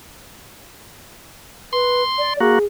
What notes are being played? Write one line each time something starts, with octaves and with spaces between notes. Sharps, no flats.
B4 C6
D5
A#3 F#4 G#4